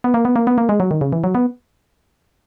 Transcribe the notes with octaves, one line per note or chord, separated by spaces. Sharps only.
B3
A#3
B3
A#3
B3
A#3
G#3
F#3
D#3
C#3
E3
F#3
B3